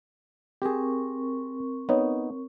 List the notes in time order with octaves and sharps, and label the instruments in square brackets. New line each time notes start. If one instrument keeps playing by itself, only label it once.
[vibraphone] C4 A#4 C#6 [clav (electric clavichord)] G4 G#4
[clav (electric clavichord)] B3 D#4 [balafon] C#5